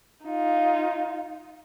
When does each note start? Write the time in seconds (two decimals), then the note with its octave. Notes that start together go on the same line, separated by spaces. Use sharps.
0.25 D#4 F4